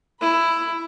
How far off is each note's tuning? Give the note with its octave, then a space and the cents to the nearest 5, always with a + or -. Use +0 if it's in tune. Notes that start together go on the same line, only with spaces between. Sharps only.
E4 +10 B5 -10